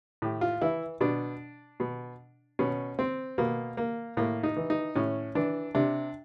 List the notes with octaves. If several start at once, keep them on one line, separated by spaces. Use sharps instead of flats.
A2 G4
F4
E3 E4
B2 D4
B2
B2 C#4
C4
B2 A#3
A#3
A2 A#3
D#4
E3
D#4
A2 C#4
E3 D4
C3 D4